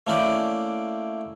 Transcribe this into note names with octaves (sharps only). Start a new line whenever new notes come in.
A3 A#3 C#4 E4 D5 G5